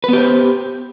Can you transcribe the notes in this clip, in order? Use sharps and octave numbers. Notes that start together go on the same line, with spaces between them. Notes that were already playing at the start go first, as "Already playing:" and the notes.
B3 G4 B4 C5